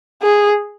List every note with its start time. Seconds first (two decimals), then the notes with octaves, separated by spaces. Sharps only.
0.22 G#4